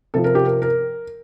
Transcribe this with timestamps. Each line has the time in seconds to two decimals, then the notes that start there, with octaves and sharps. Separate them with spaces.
0.14 C3 F3 A4
0.24 A#4
0.35 G4
0.46 A#4
0.62 A#4